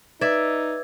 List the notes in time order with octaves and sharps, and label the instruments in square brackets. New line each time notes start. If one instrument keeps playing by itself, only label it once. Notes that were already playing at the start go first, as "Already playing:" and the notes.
[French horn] D#4 [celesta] B4 G#6 [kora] D5 E5